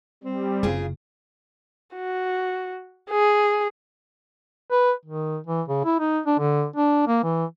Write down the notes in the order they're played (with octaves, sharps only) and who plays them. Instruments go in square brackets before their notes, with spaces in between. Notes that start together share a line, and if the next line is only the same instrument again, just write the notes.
[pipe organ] G3 [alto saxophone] C4
[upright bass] F#1 [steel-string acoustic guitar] C#3 F4 G#4
[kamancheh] F#4
G#4
[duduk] B4
D#3
E3
C#3
E4
D#4
D4
D3
D4
A#3
E3